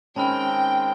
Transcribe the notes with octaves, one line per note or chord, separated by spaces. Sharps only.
D#3 G#3 C4 C#4 G5 A5 B5 F6